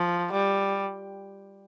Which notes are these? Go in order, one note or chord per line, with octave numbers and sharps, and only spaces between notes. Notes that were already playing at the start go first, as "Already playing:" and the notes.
Already playing: F3
G3